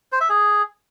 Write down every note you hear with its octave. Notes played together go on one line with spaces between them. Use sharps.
C5
E5
G#4